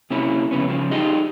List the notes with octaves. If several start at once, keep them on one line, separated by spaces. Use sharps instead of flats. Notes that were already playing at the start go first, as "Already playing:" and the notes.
C3 A#3 C#4 E4
F2 C#3 B3 C#4
C#3 F3
D#4 F4 G4 G#4 D#5